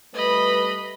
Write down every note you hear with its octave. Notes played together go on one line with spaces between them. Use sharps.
G3 A3 B4 D#5 B5